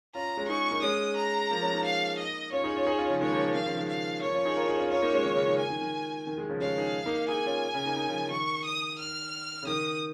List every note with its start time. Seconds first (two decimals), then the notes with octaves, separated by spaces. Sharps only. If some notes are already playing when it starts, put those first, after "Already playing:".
0.15 C#4 F4 A#5
0.37 G#3 C#4
0.48 D#4 G#4 C#6
0.71 A#3 D#4
0.82 G#3 C#4 D#6
1.16 A#5
1.51 F3 A#3
1.62 G#3 C#4
1.73 A#3 D#4
1.85 F5
2.18 D#5
2.52 C#4 F4 C#5
2.64 D#4 G#4
2.75 C#4 F4
2.87 D#4 G#4
2.98 C#4 F4
3.09 C#3 F3
3.21 D#3 G#3 C#5
3.32 F3 A#3
3.44 D#3
3.55 D#3 F5
3.66 C#3 F3
3.77 D#3 G#3
3.89 F5
4.22 F3 A#3 C#5
4.34 C#4 F4
4.45 D#4 G#4
4.57 F4 A#4
4.68 D#4 G#4
4.79 C#4 F4
4.91 C#4 F4 C#5
5.02 A#3 D#4
5.13 G#3 C#4
5.25 D#3
5.36 C#3
5.48 D#3
5.58 G#5
5.70 D#3
5.81 D#3
6.27 D#3
6.38 D#3 G#3
6.49 C#3 F3
6.61 G#3 C#4 F5
6.78 D#4 G#4
7.06 A#3 D#4
7.28 D#4 G#4 G#5
7.46 C#4 F4
7.74 C#3
7.86 A#3 D#4
7.97 A#3 D#4
8.08 C#3 F3
8.23 F3
8.31 D#3 C#6
8.65 D#6
8.99 F6
9.63 C#3
9.67 D#3 D#6